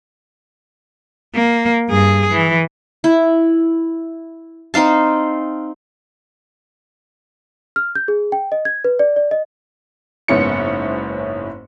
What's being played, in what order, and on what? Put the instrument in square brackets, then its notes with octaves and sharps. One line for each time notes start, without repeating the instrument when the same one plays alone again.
[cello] A#3
G2 G#4
E3
[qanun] E4
C4 D#4 F5 A5
[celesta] F6
G6
G#4
G5
D#5
G#6
B4
D5
D5
D#5
[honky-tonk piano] F#1 G#2 B3 C#4 E4 C#7